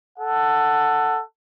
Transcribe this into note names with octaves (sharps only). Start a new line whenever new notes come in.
A4 F#5